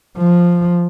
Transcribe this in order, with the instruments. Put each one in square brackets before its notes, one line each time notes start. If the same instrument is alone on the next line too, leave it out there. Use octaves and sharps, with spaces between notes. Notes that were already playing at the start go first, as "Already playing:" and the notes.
[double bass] F3